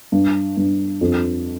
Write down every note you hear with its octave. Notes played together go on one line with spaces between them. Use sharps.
G2
G2
F2